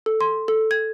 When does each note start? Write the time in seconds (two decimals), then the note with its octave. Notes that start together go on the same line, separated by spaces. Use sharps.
0.06 A4
0.21 C6
0.48 A4
0.71 G#6